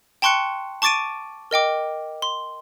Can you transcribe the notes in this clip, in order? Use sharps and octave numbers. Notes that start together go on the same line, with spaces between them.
G5 A5 C6 C#6 F#6 C#7
A5 C#6 D6 A6 D7 D#7
A#4 D#5 G5 D6
C6